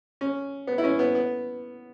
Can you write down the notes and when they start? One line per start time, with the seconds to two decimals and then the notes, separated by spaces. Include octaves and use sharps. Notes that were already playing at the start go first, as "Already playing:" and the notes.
0.21 C#4
0.67 B3
0.78 E4
0.84 C#4
0.99 B3
1.15 B3